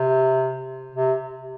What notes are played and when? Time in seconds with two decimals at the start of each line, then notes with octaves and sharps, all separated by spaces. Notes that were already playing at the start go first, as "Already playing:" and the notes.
Already playing: C3
0.95 C3